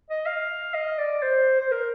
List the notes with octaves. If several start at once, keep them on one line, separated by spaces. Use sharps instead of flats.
D#5
F5
D#5
D5
C5
C5
A#4